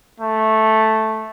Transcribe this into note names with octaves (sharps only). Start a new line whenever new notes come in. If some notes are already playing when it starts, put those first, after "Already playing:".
A3